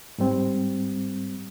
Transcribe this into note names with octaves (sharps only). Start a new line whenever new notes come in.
G#2 G3 C4